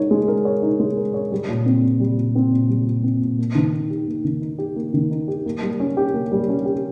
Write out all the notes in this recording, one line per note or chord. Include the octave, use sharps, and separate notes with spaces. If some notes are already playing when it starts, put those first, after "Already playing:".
Already playing: G#3 D#4 A#4 C#5
G#3
A#4
C#5
D#4
G#3
A#4
C#5
G3
A#2
C4
A#2
G3
A#2
C4
A#2
G3
A#2
C4
A#2
A#3
D#3
D#4
G4
A#3
D#3
D#4
G4
A#3
D#3
D#4
G4
A#3
G3
C#4
G4
A#3
G3
C#4
G4